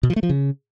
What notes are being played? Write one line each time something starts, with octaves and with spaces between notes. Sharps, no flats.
B2
F3
A3
F3
C#3